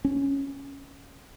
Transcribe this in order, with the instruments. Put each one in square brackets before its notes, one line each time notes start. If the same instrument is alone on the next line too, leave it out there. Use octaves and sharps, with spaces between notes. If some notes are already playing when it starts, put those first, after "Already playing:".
[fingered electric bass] C#4